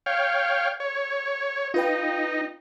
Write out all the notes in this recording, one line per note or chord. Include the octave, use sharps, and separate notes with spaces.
C#5 F5 G5
C#5
D#4 F4 B4 G5